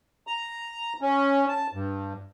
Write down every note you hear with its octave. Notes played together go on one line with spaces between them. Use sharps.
A#5
C#4
A5
G2